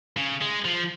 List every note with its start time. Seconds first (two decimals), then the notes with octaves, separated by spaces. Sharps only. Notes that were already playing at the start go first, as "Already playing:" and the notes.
0.17 C#3
0.41 G#3
0.65 F3